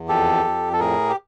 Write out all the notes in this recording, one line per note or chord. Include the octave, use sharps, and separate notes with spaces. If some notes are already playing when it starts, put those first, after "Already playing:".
Already playing: E2
F2 G4 A4
F2
A4
A2 G#4 A#4
G4